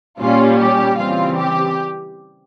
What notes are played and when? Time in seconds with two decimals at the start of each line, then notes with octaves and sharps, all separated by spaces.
0.19 A#2 G3 C#4 F4
0.59 G4
0.98 C#3 E3 G3 C4 F4
1.37 G4